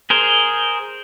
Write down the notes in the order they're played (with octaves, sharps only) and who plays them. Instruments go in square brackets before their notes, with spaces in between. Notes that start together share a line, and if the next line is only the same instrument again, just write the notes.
[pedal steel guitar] G#4 A#4 C5